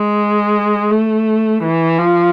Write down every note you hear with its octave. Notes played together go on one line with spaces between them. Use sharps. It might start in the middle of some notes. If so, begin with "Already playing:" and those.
Already playing: G#3
A3
E3
F3